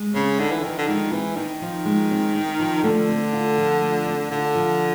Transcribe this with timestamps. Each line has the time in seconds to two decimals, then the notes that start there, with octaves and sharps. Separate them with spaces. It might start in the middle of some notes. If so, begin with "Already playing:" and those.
Already playing: G#3
0.14 C#3 C4
0.39 D3 D#4
0.52 E3
0.63 D#3 F3
0.78 D3
0.87 D#3 G#3
1.12 E3 C4
1.37 D#3 D#4
1.62 F3
1.85 G#3
2.11 C4
2.35 D#4
2.59 F3
2.83 D3 A3
3.09 C4
3.33 F4
3.58 F3
3.82 A3
4.06 C4
4.31 D3 F4
4.56 F3